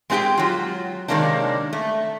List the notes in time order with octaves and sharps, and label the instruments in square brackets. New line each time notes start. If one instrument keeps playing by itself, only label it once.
[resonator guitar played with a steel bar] G#3 C4 D#4 G4 G#4 G5
F#3 F4
C3 D#3 G#3 A#3 C#4 D4
A3